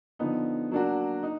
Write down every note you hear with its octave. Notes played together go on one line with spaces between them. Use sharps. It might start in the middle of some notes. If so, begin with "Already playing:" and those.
D3 F3 B3 D#4
F#3 A#3 D4 F#4
D#4